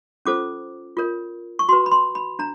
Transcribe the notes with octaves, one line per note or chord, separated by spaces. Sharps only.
C#4 F4 A4 C5 D6
F4 A#4 C#5
C#6
F#4 B4 C6
B5
C6
B5
D4 A#5